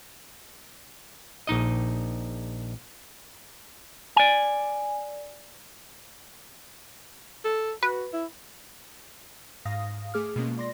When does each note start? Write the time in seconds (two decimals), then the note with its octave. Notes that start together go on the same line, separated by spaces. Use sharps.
1.47 A#1 D#4 D#5
4.16 D5 G#5
7.44 A4
7.83 F#4 B4
8.13 E4
9.65 G#2 F5 D#6 A#6
10.14 A3 G#4 D6 F6
10.36 B2 G#3 A#3 C#4 F4
10.57 D5 C6 A#6